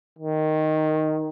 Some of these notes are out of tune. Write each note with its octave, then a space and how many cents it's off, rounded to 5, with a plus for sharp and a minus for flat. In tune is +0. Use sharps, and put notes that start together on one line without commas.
D#3 +0